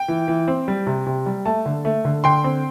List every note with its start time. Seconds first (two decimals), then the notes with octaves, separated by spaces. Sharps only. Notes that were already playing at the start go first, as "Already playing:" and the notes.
Already playing: G5
0.08 E3
0.28 E3
0.48 C4
0.68 G3
0.87 C3
1.06 C3
1.26 G3
1.46 A3 A5
1.66 D3
1.85 A3
2.05 D3
2.24 D3 G5 C6
2.44 C4